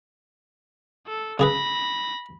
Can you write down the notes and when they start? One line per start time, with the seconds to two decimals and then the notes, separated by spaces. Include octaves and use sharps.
1.07 A4
1.39 C#3 G#4 B4 B5 A#6